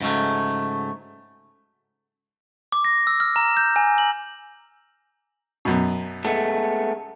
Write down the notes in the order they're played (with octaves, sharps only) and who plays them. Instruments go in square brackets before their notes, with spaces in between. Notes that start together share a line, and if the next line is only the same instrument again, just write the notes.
[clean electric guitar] G#2 C#3 F#3 A3
[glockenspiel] D6
A#6
E6
F6
A#5
G6
G#5
F#7
[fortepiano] F#2 B2
[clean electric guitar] G#3 A3 B3